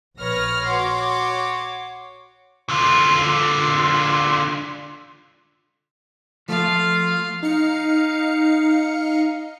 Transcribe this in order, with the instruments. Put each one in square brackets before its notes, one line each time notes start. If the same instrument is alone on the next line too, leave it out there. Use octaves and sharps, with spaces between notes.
[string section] A#1 B4 C#5 F6 A#6
F#4 C#5 C6 D6
[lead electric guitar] D3 F4
[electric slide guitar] F3 A3 [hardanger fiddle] F4 F5
[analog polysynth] D#4 F5 C#7